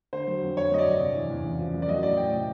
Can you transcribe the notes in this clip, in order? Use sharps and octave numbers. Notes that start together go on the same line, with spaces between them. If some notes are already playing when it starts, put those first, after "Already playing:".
D3 C5
F#3
F2
D3 C#5
F#3 D#5
D5
G2
C3
E3
E2
C#3
F3
F#2
D5
F#3 D#5
A2 D5
A2 G5
C3